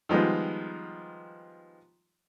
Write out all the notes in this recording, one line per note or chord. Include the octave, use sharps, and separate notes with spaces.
D#3 F3 G3 G#3 B3